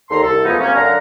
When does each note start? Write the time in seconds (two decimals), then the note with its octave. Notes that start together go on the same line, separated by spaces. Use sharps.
0.10 D#2 D#3 D4 A4 A#5 C6
0.22 C2 A4
0.44 F3 G#3 A3 B3 C#4 D#4
0.60 C3 A#3 C#4
0.75 F#2 D3 D4 F5 F#5 A#5